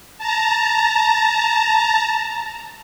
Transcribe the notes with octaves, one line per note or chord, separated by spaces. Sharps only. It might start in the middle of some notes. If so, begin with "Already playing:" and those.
A5 A#5